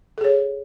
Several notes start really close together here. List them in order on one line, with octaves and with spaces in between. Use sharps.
A4 G#4 C#5